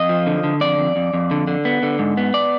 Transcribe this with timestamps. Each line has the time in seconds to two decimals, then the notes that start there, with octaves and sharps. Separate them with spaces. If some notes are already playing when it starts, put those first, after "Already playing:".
Already playing: F2 D#5
0.09 F3
0.27 D3
0.44 D3
0.61 F2 D5
0.79 F2
0.96 F2
1.14 F2
1.31 D3
1.48 D3
1.65 B3
1.83 D3
1.99 G#2
2.17 B3
2.34 D5